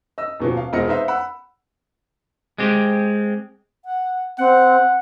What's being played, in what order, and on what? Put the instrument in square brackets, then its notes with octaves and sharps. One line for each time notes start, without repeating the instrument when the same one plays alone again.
[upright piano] D#5 E6
D#1 B2 F3
F5
E1 C4 F4 D#5 F6 C#7
D#4 B4 C5 E5 F5
F#5 B5 E6
[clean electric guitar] G#3 C4 G4
[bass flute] F#5
[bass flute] C4 [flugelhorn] F#5